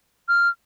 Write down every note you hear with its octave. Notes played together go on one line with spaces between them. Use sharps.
F6